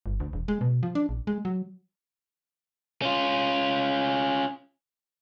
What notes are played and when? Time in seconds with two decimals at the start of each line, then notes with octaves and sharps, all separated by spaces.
0.06 G1
0.20 D2
0.33 E1
0.48 G#3
0.61 B2
0.83 F3
0.95 D4
1.09 A#1
1.27 G#3
1.45 F#3
3.02 C#4 F4